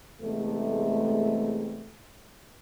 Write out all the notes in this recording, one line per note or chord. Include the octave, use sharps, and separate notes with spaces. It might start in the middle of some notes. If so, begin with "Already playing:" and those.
E2 C3 G#3 A3